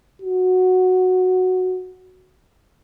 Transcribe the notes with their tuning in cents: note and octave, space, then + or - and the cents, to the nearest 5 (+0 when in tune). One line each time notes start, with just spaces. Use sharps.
F#4 -5